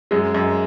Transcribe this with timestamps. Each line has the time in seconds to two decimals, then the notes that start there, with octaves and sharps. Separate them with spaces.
0.11 F#2 G#3
0.34 F#2